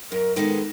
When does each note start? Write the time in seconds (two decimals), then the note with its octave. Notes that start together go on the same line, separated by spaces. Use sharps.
0.11 F#2 A#4
0.36 D#3 G#3 B3 D#4 A4 A#4